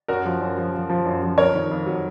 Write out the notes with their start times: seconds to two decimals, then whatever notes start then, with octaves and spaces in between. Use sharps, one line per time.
0.08 F#2 F#4 A#4
0.25 F3
0.41 F#2
0.58 F3
0.74 F3
0.89 F3
1.05 F#2
1.23 F3
1.38 F2 A#4 C#5
1.54 D#3
1.71 F2
1.86 F#3